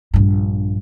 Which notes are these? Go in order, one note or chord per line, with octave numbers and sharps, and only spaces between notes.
A#1 G2